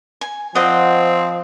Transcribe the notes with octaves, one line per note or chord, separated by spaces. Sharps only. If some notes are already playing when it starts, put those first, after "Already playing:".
G#5
F3 C4 D5 D#5 F#5